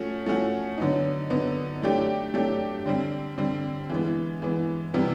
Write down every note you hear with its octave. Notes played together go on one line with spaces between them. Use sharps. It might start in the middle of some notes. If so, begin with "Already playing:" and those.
Already playing: F3 A3 C#4 F#4
F3 A3 C#4 F#4
D3 F#3 B3 D#4
D3 F#3 B3 D#4
F#3 A3 D4 G4
F#3 A3 D4 G4
D3 G3 C4
D3 G3 C4
E3 G#3 B3
E3 G#3 B3
C3 E3 G3 B3